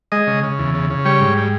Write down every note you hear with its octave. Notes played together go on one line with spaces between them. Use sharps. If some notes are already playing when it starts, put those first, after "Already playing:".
G#3 D#5
C#3
C#3
E2
C#3
C#3
G3 C#5
G#2
G3